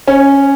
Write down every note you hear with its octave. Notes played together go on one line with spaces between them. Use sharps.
C#4